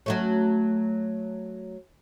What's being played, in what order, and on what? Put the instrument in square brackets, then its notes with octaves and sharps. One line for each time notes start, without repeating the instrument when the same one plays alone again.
[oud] F#3 A3 C#4